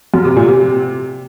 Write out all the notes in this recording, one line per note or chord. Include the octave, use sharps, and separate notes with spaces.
F#2
C3
A#2
C3